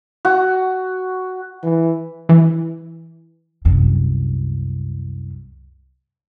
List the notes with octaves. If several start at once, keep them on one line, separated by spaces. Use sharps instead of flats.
F#4
E3
E3
C2 F#2